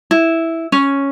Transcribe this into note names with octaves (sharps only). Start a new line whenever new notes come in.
E4
C#4